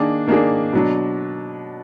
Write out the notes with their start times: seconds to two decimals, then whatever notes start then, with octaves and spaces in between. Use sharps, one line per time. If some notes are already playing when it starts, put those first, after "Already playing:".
Already playing: D#3 A#3 D4 G#4
0.27 D#3 A#3 D4 G#4
0.73 B2 F#3 D4